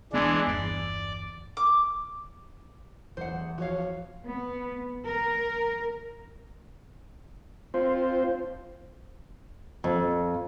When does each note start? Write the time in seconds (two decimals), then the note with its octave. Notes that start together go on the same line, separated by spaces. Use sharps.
0.13 E1 E3 G#3 B3 D4
0.47 G1 E2 D5
1.57 D6
3.17 D#1 E2 C5 F#5
3.58 F3 F#4 C#5 F5
4.25 B3
5.07 A#4
7.74 C4 F4 C5
9.84 F2